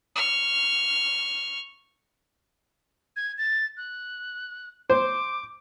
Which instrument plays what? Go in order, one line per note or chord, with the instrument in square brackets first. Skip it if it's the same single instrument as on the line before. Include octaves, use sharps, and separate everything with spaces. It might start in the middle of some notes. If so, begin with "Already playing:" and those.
[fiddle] C#6 F6
[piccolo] G#6
A6
F#6
[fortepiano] C5 [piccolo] D6